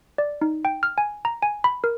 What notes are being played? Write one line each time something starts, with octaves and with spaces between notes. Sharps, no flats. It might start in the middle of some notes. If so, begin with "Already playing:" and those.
D5
D#4
G5
F6
G#5
A#5
G#5
B5
A#4